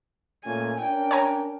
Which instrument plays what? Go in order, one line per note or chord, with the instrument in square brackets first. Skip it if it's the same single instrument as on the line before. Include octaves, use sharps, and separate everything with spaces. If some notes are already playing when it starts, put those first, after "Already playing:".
[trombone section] A#2 A3 C#4 [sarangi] G#5
[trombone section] C#4 D4 A#4 [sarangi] G5
[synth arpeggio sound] C#5 G#5 A#5